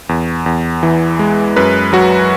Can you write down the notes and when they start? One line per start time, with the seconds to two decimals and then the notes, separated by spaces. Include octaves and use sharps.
0.09 E2
0.46 E2
0.83 E3
1.19 G#3
1.56 F#2 B4
1.93 F#3 F#4